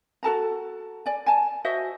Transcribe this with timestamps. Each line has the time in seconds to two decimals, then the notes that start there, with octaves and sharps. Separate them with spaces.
0.23 F#4 A4 A5 A#5
1.06 D5 G#5
1.26 G#5 A5
1.65 F#4 C5 D#5 E5